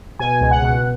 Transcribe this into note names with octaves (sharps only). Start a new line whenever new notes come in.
B2 G#5
C#2
F#5
B2